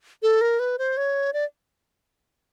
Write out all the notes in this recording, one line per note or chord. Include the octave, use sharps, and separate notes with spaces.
A4
A#4
B4
C5
C#5
D5